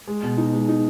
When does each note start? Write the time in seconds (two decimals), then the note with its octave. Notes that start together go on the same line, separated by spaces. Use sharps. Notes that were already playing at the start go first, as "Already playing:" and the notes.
0.07 G#3
0.23 B2
0.37 D#4
0.53 G#3
0.68 D#4